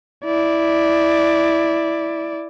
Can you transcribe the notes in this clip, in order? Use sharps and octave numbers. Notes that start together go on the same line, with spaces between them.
E4 D5